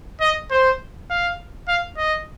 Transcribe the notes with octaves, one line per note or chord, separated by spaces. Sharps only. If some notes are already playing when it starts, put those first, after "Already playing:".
D#5
C5
F5
F5
D#5